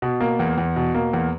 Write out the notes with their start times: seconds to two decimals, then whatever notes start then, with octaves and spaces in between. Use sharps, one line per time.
0.02 B2
0.20 A#3
0.39 E2
0.58 E2
0.76 B2
0.95 A#3
1.13 E2